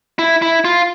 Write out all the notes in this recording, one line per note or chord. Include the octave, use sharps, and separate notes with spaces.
E4
E4
F4